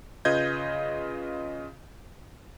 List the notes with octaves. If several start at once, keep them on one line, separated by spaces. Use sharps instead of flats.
C#3 F4 B4 D#5 G6 G#6